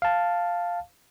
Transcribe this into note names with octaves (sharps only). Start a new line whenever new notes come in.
F5 A5